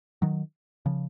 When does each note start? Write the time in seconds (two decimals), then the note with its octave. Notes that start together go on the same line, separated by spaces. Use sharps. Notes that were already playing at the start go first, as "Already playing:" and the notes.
0.22 D#3 F#3
0.86 C#3 F3